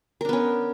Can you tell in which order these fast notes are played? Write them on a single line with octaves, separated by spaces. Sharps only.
A#4 D4 B3 C#4